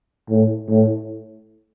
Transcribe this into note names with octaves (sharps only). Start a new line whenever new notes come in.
A2
A2